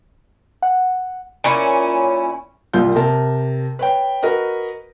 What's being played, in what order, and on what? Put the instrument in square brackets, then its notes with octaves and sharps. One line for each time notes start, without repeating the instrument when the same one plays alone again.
[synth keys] F#5
[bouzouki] A#2 C#4 E4
[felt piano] C2 A#2 F4 G6
C3 A#4 A5
B4 C#5 G5
F#4 A#4 B4 D#5